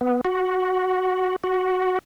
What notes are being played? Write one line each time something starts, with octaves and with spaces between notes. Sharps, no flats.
B3
F#4
F#4